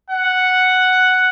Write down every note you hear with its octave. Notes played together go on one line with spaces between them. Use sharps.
F#5